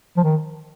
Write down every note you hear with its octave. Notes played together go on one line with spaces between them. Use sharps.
F3
D#3